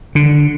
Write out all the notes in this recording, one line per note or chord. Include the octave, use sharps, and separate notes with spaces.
D3